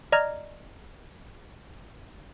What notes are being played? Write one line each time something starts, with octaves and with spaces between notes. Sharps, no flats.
D5 D#5 A#5 F6 G#6